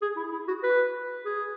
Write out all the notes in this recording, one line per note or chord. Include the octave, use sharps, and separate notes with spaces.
G#4
E4
E4
F#4
B4
G#4